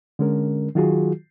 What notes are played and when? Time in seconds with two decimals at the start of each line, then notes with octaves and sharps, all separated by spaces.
0.19 D3 G#3 C#4 A#4
0.75 D#3 F#3 F4 F#4 G#4